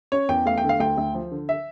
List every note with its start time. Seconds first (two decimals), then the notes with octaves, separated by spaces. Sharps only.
0.12 C#4 C#5
0.29 E2 G5
0.46 A3 F5
0.58 G5
0.64 D3
0.69 F5
0.80 D2 G5
0.98 D2
1.15 F3
1.32 D3
1.49 E5